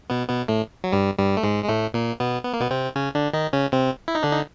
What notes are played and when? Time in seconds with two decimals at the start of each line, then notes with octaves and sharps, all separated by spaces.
0.10 B2 B3
0.29 B2 B3
0.48 A2 A3
0.84 F#3
0.92 G2 G3
1.18 G2 G3
1.37 A3
1.43 G#2 G#3
1.64 G#3
1.68 A2 A3
1.94 A#2 A#3
2.20 B2 B3
2.45 B3
2.53 A#3
2.60 B2 B3
2.70 C3 C4
2.96 C#3 C#4
3.15 D3 D4
3.33 D#3 D#4
3.53 C#3 C#4
3.72 C3 C4
4.08 E4
4.15 D#4
4.23 D3 D4
4.33 D#4